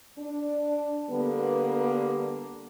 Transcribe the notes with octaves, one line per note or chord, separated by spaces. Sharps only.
D4
D3 G3 A#3 B3